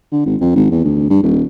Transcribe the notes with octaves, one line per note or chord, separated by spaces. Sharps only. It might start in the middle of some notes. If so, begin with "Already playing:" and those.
D3
G#1
F2
G#1
E2
D2
G2
D#1